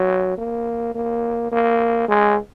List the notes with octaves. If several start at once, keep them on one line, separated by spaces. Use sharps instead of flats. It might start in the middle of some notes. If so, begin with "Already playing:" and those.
Already playing: F#3
A#3
A#3
A#3
G#3